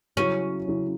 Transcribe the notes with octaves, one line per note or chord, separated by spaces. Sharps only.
C#3 F#3 C#4 E4
C#3 F#3 E4